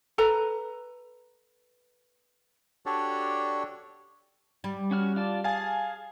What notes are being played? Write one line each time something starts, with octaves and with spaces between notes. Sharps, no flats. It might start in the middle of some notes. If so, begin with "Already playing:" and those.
A4 B4 A#5
D4 F#4 G4 A4 C#5 D5
G3
C#4 F#4 F6
F4 D5 A5
G#4 F5 G#5 A5